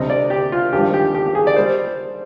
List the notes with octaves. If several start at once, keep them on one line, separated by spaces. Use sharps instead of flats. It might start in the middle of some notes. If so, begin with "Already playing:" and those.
Already playing: D2 C3 G3 C4 D#5
D5
G4
F4
G#1 G2 F3 G4
G4
G4
G4
G#4
D5
G3 C5